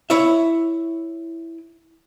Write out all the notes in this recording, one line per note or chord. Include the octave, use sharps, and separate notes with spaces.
E4 C#5 E5